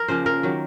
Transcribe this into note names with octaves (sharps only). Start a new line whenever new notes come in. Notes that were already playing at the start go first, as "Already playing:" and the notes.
Already playing: A#4
C#3 F3 A#3 C5
A#4
D#3 F#3 A#3